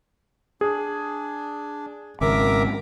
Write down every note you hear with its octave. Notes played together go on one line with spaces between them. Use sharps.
D4 G#4
G#1 C#3 A#4 E5 D6